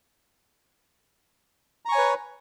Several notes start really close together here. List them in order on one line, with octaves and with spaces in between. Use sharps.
A#5 C#6 G#5 C#5 B4